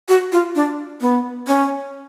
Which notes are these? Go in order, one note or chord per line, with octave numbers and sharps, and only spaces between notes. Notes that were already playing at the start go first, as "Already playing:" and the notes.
F#4
F4
D4
B3
C#4